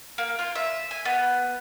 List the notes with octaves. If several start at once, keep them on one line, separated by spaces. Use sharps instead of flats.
A#3
F4
E5
G#5
B3